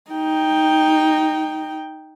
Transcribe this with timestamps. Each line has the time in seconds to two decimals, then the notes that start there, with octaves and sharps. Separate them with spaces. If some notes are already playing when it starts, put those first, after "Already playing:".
0.11 D#4 G5